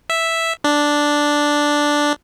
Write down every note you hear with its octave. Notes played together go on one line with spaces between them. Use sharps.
E5
D4